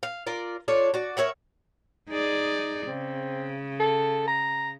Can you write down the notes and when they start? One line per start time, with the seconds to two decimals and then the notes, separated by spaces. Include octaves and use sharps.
0.03 F5
0.27 F4 A#4 D5
0.68 D4 F4 A4 C#5
0.94 F#4 D5
1.17 A#4 C#5 E5 F#5
2.09 D#4 G#4 D5
2.88 C#3 C4
3.80 A4
4.28 A#5